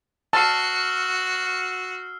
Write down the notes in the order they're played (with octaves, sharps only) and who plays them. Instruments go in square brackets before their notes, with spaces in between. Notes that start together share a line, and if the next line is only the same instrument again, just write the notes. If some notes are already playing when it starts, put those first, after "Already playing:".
[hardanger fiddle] F#4 [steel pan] A5 [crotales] E6 F6 C7